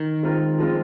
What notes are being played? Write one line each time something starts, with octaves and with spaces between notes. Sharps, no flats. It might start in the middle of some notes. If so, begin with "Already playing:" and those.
Already playing: D#3
G#3 C4 F4 A#4
F3 G#3 C4 F4